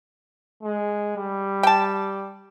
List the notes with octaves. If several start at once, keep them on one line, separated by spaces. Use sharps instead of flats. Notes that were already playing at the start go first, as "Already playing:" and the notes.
G#3
G3
G5 A5